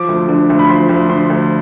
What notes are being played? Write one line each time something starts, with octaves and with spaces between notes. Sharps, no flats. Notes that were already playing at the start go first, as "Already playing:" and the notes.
Already playing: F3 D6
D2
D3
D2
B5
F3 C6
D2
D3 C6
D2